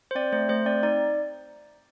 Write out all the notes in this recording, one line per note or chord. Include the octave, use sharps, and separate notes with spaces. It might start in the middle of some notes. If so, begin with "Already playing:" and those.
C5
C4 D5
A3 C5
A3 C5
C4 D5
D#4 D5